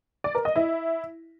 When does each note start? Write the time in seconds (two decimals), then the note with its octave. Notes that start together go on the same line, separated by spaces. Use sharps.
0.24 D5
0.35 A#4
0.45 D#5
0.56 E4